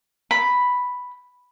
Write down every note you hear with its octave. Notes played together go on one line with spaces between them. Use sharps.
B5